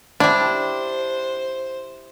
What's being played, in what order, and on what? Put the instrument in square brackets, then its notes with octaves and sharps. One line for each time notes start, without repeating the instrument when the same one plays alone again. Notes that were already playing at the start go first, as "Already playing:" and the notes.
[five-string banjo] D4 [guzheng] E4 G4 [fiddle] C5